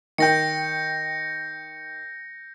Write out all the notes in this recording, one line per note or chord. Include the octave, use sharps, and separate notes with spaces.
D#3 G5 G6 A#6 C#7